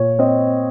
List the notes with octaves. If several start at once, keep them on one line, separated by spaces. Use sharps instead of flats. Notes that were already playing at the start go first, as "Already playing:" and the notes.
Already playing: A#2 C#5
C4 D#5